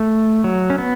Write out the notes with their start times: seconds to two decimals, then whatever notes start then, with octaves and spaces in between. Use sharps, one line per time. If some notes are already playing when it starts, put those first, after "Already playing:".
Already playing: A3
0.44 F#3
0.70 C#4
0.78 B3